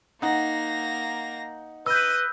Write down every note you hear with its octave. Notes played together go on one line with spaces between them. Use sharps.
A#3 D#4 F#5 A#6
B4 D#5 E6 G6